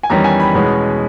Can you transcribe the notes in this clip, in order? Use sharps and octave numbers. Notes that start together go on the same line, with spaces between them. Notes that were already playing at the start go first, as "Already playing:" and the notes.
G#5
E2 D#3 G3 C#4 A#5
G#5
B5
E2 B2 G#3 C#4